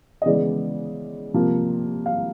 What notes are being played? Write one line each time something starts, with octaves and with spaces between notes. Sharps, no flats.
D#5
C#3 E3 G#3 B3 D5
C3 F3 A#3
F5